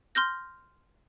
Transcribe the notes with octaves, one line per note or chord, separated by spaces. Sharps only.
C6 F6 G6 A#6